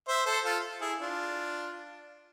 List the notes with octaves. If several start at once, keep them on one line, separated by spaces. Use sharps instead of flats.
C5 E5
A4 C5
F4 A4
E4 G#4
D4 F4